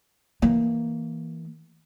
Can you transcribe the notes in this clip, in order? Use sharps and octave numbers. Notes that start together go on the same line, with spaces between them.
E3 A#3